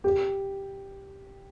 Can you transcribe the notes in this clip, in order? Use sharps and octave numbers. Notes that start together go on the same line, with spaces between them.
G4